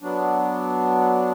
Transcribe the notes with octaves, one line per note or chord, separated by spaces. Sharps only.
F#3 B3 D4